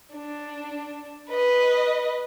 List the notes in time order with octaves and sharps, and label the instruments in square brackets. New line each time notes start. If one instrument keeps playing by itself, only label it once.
[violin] D4
B4 D#5